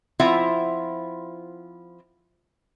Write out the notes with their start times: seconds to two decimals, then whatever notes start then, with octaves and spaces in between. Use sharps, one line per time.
0.19 F3 C4 E4 F4 E5 F#5